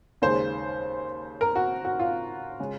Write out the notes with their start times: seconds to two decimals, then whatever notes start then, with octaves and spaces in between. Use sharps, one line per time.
0.22 D#2 C#3 G#3 C5
1.41 A#4
1.55 F#4
1.85 F#4
1.99 F4
2.60 C#3 G#3